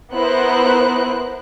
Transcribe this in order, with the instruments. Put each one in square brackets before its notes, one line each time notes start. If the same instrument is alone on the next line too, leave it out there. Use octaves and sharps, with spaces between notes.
[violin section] B3 E4 A#4 C5 F#6